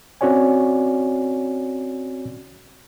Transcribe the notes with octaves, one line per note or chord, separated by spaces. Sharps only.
C4 C#4 F#4 C#5 D5 G#5